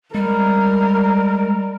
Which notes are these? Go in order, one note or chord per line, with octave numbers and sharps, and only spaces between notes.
G3 G#3 A#4